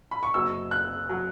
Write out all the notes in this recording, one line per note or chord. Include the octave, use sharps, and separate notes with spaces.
B5
C#6
F#1 F#2 F#3 E6
F#6
F#3